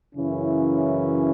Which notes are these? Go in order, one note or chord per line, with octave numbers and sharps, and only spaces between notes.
F#2 C#3 E3 C#4 E4